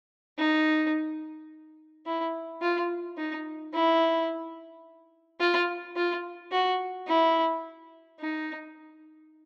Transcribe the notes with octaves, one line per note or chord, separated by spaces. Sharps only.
D#4
E4
F4
D#4
E4
F4
F4
F#4
E4
D#4